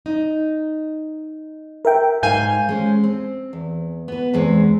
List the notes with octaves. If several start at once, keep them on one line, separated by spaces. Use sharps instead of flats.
D#4
A#4 E5 G5
G#2 F5 G#5 G6
G#3 C#4 C5
C4
E2
B3 B4
E2 G#3 C4 B4